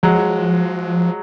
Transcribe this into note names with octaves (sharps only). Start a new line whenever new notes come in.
F3 F#3 G#3